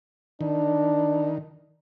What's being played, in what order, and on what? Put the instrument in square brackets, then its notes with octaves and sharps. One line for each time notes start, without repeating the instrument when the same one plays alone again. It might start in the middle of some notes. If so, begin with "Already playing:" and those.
[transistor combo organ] D#3 [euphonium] D4